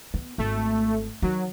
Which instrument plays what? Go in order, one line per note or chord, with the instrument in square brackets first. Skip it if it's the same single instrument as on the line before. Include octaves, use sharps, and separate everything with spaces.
[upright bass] B3
[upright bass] G#1 [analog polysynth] A3
[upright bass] D#3 [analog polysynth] F#3